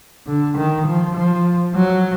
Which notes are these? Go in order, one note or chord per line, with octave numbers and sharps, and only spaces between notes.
D3
D#3
F3
F3
F#3